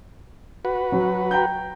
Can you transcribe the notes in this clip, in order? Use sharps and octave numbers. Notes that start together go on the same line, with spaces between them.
F#4 B4
F#3
G5 A#5 G6